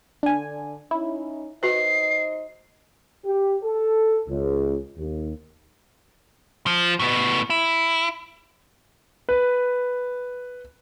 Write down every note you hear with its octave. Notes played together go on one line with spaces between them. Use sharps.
D3 D4 G#5
C#4 D#4 E4
D#4 F#4 B4 C5 D#5 C7
G4
A4
C#2
D#2
F3
A2 B3
E4
B4